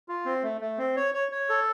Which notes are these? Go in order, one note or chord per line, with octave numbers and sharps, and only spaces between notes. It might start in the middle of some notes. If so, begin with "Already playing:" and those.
F4
C4
A3
A3
C4
C#5
C#5
C#5
A4